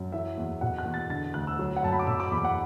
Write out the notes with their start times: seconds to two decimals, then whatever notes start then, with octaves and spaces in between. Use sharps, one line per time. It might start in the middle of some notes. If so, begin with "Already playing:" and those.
Already playing: F#2
0.12 E3 E5
0.37 E2
0.61 B2 F#5
0.78 F#6
0.85 E2
0.94 A6
1.10 D3 A6
1.34 D2 F#6
1.47 E6
1.59 F#3
1.77 F#5
1.83 F#2 A5
1.92 B5
2.00 D6
2.07 B2 E6
2.20 D6
2.31 E2 B5
2.45 F#5